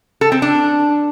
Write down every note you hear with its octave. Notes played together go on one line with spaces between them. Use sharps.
A4
C4
D4